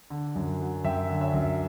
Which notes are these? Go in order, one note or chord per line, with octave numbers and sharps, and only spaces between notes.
D3
F#2
F#3
F#2 E5 G5
D3
C#5 E5
F#2